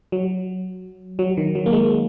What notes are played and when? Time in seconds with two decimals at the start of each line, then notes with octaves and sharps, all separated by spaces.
0.12 F#3
1.19 F#3
1.37 D#3
1.55 F#3
1.66 A#3
1.73 G#3